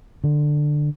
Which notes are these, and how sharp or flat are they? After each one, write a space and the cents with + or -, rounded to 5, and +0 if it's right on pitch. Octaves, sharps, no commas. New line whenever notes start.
D3 +15